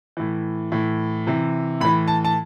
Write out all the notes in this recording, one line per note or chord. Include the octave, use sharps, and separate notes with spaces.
A2 E3
A2 E3
C3 E3
A2 E3 B5
A5
A5